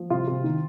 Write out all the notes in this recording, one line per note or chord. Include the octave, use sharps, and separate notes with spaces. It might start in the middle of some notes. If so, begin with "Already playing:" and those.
Already playing: F3
C3 F4
C3
D#3